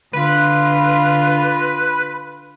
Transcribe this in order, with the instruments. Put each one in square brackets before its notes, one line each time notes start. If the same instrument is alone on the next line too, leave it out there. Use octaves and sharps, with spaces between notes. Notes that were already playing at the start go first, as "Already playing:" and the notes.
[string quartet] D3 F4 [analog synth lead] B4